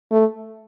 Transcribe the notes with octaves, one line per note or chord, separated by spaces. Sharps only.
A3